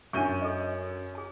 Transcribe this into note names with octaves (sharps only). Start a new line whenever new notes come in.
F#2 D4 E5 C#6 G6 D#7
A4 D#5
G#4 A5